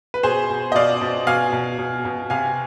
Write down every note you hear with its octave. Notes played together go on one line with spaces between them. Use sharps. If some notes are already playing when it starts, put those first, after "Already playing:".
B4
B2 G#4 C5
B2
D#5
B2 D5 F5
B2
B2 F5 G#5
B2
B2
B2
C3 F5 G#5